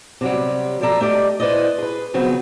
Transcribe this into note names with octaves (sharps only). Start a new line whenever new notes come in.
C3 F#3 G3
F3 A4 D5 E5 A#5
A3 G4 D5 D#5
E4 B4 C5 D5 D#5
G#4 B4
C#3 F3 F#3 B3 C4